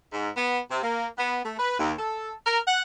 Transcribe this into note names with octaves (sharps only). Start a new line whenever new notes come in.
G#2
B3
C3
A#3
B3
A3
B4
D#2
A4
A#4
F#5